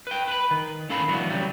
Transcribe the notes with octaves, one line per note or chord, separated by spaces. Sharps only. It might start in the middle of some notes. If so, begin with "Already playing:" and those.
B4 G5
B4 B5
D#3
A2 C#4 A4 F5 B5
E3 F#3 A3 B3 D4
C#3 F#3 G3